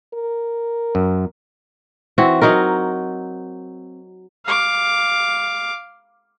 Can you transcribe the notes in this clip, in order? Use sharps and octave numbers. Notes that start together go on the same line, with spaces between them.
A#4
F#2
E3 C4 F#4
F#3 D#4 F#4 A#4
F5 D6